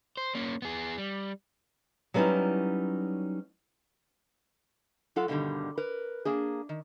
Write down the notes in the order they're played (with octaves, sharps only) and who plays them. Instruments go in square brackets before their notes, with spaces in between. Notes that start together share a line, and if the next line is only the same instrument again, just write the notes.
[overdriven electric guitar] C5
A#3 C#4
B3 G#4
G3
[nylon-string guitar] F#3 G3 B3 C#4 D#4 E4
[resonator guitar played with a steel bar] F#3 F4 A4 F#5
G2 B2 D3 D#3 G3
A#4 B4
A#3 D4 G#4
D#3